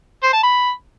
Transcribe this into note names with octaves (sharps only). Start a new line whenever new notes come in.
C5
A5
B5